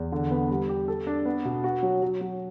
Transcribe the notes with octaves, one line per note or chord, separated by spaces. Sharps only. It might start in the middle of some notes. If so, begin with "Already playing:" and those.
Already playing: E2
D3
B3
G3
G4
A4
D4
B3
B2
F#4
F#3
F#3
F#3